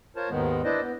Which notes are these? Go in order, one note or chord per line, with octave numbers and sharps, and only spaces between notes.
F4 A#4 C5 C#5 A5
D#2 G#2 D#3 G#3 B3
D4 E4 B4 C5 D5 D#5
B3